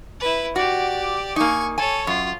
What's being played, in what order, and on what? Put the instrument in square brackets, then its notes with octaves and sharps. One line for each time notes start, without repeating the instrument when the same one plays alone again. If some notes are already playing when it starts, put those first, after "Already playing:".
[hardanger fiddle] E4 B4
[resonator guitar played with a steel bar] F#4 [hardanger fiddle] G4 D5
[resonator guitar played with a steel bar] A#3 D#4 [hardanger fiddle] G#5 C#6
[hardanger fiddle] A4 C#5 [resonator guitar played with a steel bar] G#5
[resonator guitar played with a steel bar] F#2 [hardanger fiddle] F4